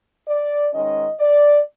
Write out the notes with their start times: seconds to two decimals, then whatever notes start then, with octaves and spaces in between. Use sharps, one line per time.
0.28 D5
0.74 G#2 D#3 G#3 C#4 D#5
1.20 D5